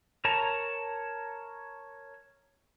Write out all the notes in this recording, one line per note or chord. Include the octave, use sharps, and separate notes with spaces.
A#4 C#5 A5 A#5